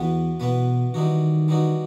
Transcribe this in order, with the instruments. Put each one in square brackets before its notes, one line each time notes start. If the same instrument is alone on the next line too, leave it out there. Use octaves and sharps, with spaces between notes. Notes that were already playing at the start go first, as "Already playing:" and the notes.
Already playing: [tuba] E2 [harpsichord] E3 B3 F#4 B4
[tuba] B2 [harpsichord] E3 B3 F#4 B4
[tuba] D#3 [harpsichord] E3 G3 D#4 F#4
[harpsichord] E3 G3 D#4 F#4